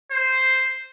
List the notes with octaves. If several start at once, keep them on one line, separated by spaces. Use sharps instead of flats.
C5